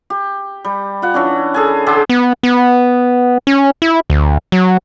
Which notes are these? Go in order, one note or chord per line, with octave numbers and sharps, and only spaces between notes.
G4
G3
F4 F#5
E3 C#4 D4
G#4 A4 G#5
D3 G4 G#4 C6
B3
B3
C#4
E4
D2
F#3